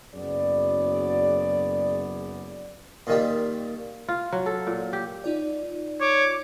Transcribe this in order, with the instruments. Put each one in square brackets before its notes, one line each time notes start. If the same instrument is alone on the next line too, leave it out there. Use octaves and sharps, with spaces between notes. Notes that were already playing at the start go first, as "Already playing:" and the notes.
[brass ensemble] F#1 F#2 B3 F#4 G#4 D5
[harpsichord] A#2 D#3 G3
[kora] F4
F#3
A4
A#2
G4
[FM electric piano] D#4 F4 D5
[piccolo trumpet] C#5 [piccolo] D6